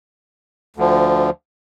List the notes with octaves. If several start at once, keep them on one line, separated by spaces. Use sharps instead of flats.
D2 D3 F3